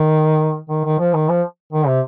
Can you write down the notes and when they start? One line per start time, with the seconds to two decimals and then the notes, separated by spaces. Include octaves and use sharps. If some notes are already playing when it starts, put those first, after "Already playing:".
Already playing: D#3
0.69 D#3
0.85 D#3
0.99 F3
1.13 D#3
1.29 F3
1.73 D#3
1.87 C3